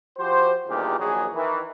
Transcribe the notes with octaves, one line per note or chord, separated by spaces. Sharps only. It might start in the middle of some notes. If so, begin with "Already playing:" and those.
F3 F#4 G4 C5
E2 G2 A#2 D#3 G4 G#4
A#1 D#3 F#3 G#4
D#3 E3